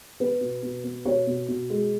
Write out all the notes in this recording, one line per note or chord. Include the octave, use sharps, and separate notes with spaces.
B3 B4
B2
B2
B3
B2 C#5
B2
B2
G#3